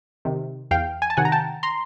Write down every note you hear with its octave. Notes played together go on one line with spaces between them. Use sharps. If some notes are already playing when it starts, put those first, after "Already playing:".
C3 D#3
E2 F5 G5
G#5
A5
C3 D#3 F#5 G#5
A#5
G5 A5
A#5 C6